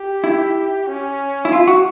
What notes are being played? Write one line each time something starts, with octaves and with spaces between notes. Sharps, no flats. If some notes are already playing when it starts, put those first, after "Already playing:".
Already playing: G4
E4
C#4
E4
F4
F#4